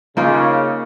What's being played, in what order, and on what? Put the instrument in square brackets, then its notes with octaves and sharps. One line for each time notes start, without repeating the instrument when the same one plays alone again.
[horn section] C#3 [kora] A#3 D#4 F4